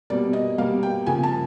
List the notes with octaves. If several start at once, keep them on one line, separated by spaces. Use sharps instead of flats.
B2 G3 A#3 D5
D#5
B2 G3 A#3 F5
G5
C#3 F3 A#3 G#5
A5